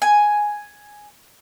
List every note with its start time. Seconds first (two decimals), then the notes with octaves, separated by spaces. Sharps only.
0.02 G#5